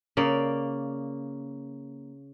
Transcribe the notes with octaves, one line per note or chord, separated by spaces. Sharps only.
C#3 A#3 D5